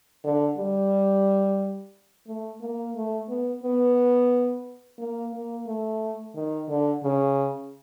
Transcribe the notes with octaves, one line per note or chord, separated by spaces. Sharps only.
D3
G3
A3
A#3
A3
B3
B3
A#3
A#3
A3
D#3
D3
C#3